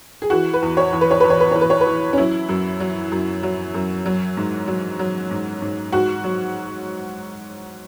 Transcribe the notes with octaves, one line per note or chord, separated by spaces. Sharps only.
G#4
E3 F#4
B4
E2
C#5
E2
B4
C#5
E2 B4
C#5
B4
E3 C#5
B4
C#5
B4
E3
C#4
F#3 E4
F#2
F#3
F#2
F#3
F#2
F#3
G#2
F#3
F#3
G#2
G#2
G#2 F#4
F#3